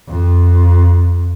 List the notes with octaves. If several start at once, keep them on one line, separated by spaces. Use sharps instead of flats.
F2